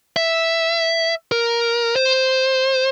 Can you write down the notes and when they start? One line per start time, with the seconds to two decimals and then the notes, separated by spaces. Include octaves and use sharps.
0.16 E5
1.32 A#4
1.96 C5